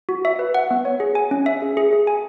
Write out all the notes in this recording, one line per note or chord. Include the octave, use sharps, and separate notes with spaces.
F#4
E5
B4
F#5
B3
C#5
G#4
G#5
C#4
E5
G#4
G#4
G#4
G#5